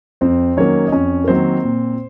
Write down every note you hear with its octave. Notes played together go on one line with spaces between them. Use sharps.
F2 C4 C5
D#3 F#3 A#3 C#4 C#5
D#5
F2 C#4 C#5
A#4
D#3 F#3 A#3 C4 C5
A#2